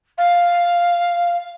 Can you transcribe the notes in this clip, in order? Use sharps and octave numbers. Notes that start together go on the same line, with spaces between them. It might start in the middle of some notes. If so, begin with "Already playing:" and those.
F5